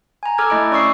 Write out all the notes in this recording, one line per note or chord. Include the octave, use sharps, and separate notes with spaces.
G#5 A#5
A4 A#5 D6 E6 F6 G#6
A3 E4 D#5 B5 D7
C#4 D5 C#6 D#6 E6 C7